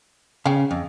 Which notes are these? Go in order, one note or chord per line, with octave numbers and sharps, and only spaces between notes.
C#3 F5 G5
F2